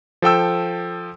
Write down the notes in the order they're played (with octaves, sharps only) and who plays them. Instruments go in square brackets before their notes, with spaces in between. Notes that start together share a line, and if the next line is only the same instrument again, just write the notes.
[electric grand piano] F3 A4 G5 E6